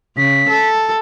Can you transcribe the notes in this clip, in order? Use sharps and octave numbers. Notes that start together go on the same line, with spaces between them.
C#3 B6
A4